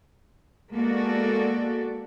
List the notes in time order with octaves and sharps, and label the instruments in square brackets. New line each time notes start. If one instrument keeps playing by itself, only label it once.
[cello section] G#3 A#3 B3 F#4 A4 D5